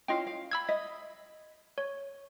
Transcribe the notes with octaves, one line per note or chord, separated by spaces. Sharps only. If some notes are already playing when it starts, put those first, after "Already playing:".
C#4 E4 F4 D#5 F5 G5
F5
B5 E6 G#6
D#5 E5
C#5